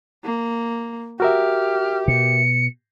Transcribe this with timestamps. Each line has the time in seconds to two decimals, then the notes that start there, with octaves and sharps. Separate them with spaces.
0.25 A#3
1.20 F#4 G4 A#4 E5 F6
2.08 B2 C#7